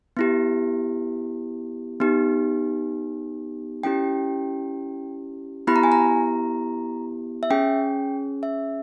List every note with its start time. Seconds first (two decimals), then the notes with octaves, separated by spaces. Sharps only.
0.17 B3 E4 G4
2.00 B3 D#4 G4
3.83 C#4 E4 G4 G5
5.67 B3 E4 G4 B5
5.76 A#5
5.83 G#5
5.92 A#5
7.43 E5
7.50 C#4 G#4 G5
8.43 E5